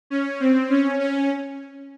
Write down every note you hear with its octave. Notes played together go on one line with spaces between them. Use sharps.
C#4
C4
C#4
C#4